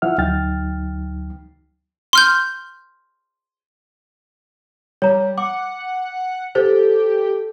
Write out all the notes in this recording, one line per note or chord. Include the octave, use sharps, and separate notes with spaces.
F3 E4 E5 F#5 F6
D2 F#3 D#4 G5 F6 A6
C6 F6 G6
G3 C#5 A#5
F#5 D6
G4 A4 C5